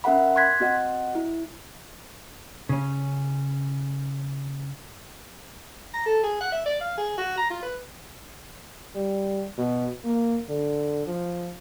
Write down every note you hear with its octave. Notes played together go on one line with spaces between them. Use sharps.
C#4 A#4 E5 F#5 B5
C6 F#6 G#6 B6
C4 F#4 D#5 F#5
E4
C#3 C#4
A#5
A4
G#4
F#5
E5
D5
F5
G#4
F#4
A#5
F4
B4
G3
B2
A#3
D3
F3